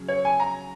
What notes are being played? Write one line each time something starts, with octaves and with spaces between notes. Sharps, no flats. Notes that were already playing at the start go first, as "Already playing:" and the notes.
Already playing: C#3 F#3
C#5
G#5
A#5